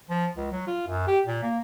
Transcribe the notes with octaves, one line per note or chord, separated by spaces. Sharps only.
F3
C#2
F#3
F4
F#2
G4
A#2
A#3